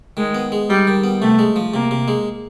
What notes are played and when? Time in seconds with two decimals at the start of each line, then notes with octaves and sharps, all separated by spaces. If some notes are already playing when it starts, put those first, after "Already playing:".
0.17 D#3 G#3
0.35 B3
0.52 G#3
0.70 G3 D#4
0.87 D#3
1.04 B3
1.21 C3 A3
1.39 G#3
1.56 F3
1.74 C3 A#3
1.91 C3
2.08 G#3